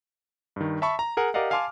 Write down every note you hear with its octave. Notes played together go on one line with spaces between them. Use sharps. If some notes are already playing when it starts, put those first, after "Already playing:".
G2 D#3
E5 A5 B5 C#6
A#5
G#4 A#4 F#5
G4 A#4 D5 D#5 F5 F#5
F5 G#5 A5 C6 D6 F6